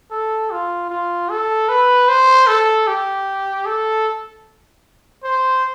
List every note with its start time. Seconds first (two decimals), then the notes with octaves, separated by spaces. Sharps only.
0.11 A4
0.51 F4
0.89 F4
1.29 A4
1.69 B4
2.08 C5
2.47 A4
2.87 G4
3.66 A4
5.24 C5